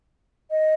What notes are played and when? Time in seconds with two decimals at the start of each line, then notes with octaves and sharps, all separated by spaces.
0.50 D#5